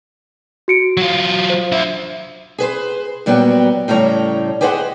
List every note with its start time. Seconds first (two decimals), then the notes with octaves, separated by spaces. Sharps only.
0.68 F#4 C#7 D7
0.97 F#3 F4
1.50 C5
1.72 D4 E5
2.58 G#4 B4 C5
3.26 A#2 F#3 G3 B3 F#4 G5
3.88 A2 C#3 G3 A4 C#5 A#5
4.61 G4 G#4 B4 C5 D#5 F#5